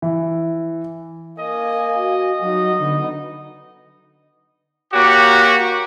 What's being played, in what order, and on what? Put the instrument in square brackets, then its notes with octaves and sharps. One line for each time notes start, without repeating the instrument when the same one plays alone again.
[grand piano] E3
[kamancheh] A#3 G#5 [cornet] D#5
[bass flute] F#4
[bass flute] F#3 [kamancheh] D#4 F#4
[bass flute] D3 [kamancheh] B3 D#4
[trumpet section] A#3 F#4 G4 C#5 F#5 D6